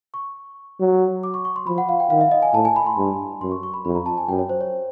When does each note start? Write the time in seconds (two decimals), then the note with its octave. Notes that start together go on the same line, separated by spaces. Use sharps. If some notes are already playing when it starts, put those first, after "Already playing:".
0.14 C#6
0.80 F#3
1.23 D6
1.34 C#6
1.45 C#6
1.56 C6
1.66 F3 B5
1.78 F#5
1.89 F5
2.00 G5
2.10 D#3 F5
2.21 E5
2.31 D#5
2.42 G#5
2.53 A2 A5
2.65 G#5
2.76 B5
2.86 C6
2.97 G2
3.41 F#2 C6
3.51 C#6
3.63 C#6
3.74 B5
3.85 F2 B5
3.95 A#5
4.06 A5
4.18 G#5
4.28 F#2 G5
4.39 C#5
4.50 C5
4.61 C#5